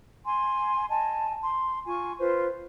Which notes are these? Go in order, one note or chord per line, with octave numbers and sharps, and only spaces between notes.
G#5 C6
D#5 G#5 A5
C6
F4 G#5 C#6
F4 B4 C5